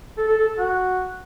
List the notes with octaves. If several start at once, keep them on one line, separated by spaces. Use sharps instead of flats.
A4
A4
A4
A4
F#4